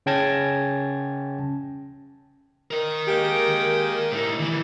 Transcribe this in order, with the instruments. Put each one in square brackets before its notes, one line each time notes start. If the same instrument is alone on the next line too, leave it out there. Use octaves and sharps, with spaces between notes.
[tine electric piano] C#3 C#4 G5 A5 G#6 A#6
[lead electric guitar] A#4 D#5
[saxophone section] G#3 A#3 G4
[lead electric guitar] A2 D#4
D#3 E3